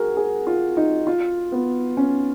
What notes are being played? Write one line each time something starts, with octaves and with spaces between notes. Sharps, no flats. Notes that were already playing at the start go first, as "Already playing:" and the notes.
Already playing: F#4 G#4 A#4
G#4
F4
D#4
F4
B3
C#4